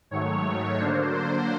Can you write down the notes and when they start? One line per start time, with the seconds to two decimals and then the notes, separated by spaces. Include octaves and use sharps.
0.11 G#2 D#3 F#3 A3 C#5
0.80 D3 F#3 A#3 D4 C5
1.14 C5